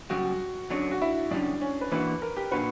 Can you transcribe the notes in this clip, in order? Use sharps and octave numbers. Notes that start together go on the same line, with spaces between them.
F#2 C#3 G3 F#4
D3 F#3 C#4 D4
F#4
E4
F#2 C#3 G3 C#4 D4
C#4
B4
E3 A#3 D4 F#4 B4
A#4
G4
A#2 A#3 D4 F#4 B4